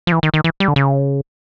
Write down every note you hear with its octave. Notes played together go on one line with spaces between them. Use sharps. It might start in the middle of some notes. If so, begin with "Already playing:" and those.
F3
E3
D#3
D#3
E3
G3
D3
C#3